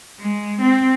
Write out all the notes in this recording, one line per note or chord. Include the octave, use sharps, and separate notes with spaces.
G#3
C4